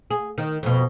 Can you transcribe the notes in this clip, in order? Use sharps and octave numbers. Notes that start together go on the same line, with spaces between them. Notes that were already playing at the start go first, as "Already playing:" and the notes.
G#4
D#3
F2 B2